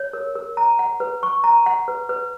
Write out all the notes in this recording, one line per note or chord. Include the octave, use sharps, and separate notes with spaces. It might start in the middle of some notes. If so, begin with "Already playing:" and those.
Already playing: C#5
A#4
A#4
A#5
F#5
B4
C#6
A#5
F#5
B4
B4